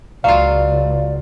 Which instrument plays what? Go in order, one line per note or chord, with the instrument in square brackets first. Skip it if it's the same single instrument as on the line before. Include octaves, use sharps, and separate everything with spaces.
[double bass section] C#2 [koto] F#3 F4 [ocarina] D5 [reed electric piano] F5